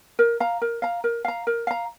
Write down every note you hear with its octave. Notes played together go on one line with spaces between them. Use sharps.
A#4
F5 A#5
A#4
F5 A#5
A#4
F5 A#5
A#4
F5 A#5